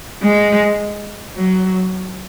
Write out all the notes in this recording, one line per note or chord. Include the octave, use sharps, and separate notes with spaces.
G#3
F#3